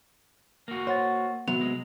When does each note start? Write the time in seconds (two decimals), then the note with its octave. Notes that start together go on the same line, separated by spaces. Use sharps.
0.68 A#3 F#4
0.87 C5 C#5 F#5 A6
1.48 C3 F#3 B3 F7
1.61 G#3